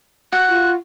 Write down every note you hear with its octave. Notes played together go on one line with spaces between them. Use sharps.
F#4 F#6
F4